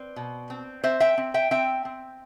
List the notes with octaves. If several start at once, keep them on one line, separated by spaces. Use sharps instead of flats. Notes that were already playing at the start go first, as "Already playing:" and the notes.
Already playing: C4 B4 D5
B2
C4
C4 C5 E5
E5 G5
C4
E5 G5
C4 E5 G5
C4